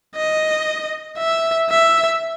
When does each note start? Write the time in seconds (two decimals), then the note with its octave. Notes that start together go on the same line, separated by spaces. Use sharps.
0.16 D#5
1.18 E5
1.70 E5